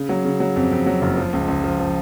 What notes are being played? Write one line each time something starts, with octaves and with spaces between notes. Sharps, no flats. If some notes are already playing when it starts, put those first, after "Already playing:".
Already playing: C#3
F#3
C#3
F#3
F2
F2
F#3
F#1
F3
C#2
C#2
F3
F3